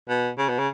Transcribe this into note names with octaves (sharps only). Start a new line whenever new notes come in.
B2
C#3
B2
C#3